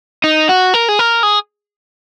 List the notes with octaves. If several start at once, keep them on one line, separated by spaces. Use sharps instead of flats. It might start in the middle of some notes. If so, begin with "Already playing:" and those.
D#4
F#4
A#4
G#4
A#4
G#4